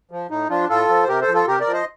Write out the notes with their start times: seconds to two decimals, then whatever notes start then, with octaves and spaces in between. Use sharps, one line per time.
0.11 F3
0.30 A2 D#4
0.50 F3 D4 F4
0.69 A2 F4 A4
0.89 F3
1.03 C5
1.08 C3 G4 A#4
1.21 A4 C5
1.28 F3
1.34 F4 A4
1.47 C3 G4 A#4
1.60 A#4 D5
1.67 F3
1.73 C5 D#5